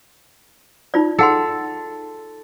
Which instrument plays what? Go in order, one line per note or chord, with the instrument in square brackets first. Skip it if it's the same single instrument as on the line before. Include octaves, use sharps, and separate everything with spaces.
[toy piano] D#4 F4 D5
[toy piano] G#4 F#5 C6 [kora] A4